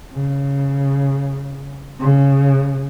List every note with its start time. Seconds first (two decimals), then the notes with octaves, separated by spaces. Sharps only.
0.14 C#3
2.00 C#3